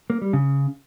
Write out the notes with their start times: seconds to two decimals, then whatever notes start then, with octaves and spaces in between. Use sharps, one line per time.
0.10 A#3
0.22 G3
0.33 C#3